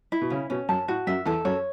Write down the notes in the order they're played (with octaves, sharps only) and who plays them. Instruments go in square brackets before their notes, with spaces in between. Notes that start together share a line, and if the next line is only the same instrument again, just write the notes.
[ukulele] E4
[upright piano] B2
[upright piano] C#3 [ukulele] C#4
[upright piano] B2 [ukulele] C#4
[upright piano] F#2 [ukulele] A5
[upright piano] A2 [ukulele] F#4
[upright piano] F#2 [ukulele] E5
[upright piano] E2 [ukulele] A4
[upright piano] F#2 [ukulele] C#5